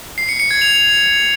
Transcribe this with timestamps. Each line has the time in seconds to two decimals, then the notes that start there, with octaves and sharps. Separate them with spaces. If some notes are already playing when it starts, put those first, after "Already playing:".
0.18 C7
0.29 C#7
0.40 C#7
0.51 G#6
0.62 F7